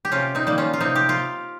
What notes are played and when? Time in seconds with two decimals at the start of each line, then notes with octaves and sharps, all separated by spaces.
0.05 G4
0.11 C3 C#4 F4
0.35 C4 D#4
0.47 D#3 G3 A#3
0.58 C#4 F4
0.73 F4
0.80 C3 C4 D#4
0.95 G4
1.09 F4